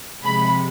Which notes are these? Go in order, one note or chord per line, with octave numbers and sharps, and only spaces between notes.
C3 F3 G#3 B5